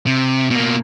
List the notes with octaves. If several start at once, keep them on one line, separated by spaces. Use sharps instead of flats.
C3
B2 A#3